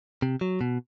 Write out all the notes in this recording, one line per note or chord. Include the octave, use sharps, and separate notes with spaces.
C3
F#3
B2